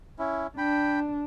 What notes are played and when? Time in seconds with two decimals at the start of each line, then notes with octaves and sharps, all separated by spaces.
0.19 C#4 E4
0.58 D4 G5 B5